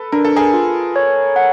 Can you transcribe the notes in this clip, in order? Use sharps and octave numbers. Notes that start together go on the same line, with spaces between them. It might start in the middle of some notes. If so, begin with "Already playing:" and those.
Already playing: A4 B4
D4 A#4
A4
G#4 A#4
F4
C#5
F#5